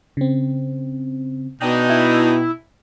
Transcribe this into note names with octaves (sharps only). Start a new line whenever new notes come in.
C#3 C4
B2 D4 D#4 G5 A5
E4